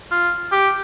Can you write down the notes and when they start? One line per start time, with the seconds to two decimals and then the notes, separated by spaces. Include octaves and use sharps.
0.11 F4
0.52 G4